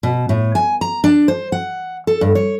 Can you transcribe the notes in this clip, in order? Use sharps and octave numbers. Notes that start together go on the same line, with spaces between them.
B2
A2
G#5
A#5
D4
C5
F#5
A4
G2
C#5